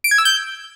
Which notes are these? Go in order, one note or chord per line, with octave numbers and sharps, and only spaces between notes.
D7
G#6
E6
G6